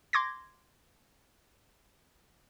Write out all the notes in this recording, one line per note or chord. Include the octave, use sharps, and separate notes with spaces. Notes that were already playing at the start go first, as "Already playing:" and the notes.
C6 D6 G#6 A#6